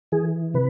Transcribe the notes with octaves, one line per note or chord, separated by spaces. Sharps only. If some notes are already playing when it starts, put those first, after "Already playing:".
E3 G#4
C3 B4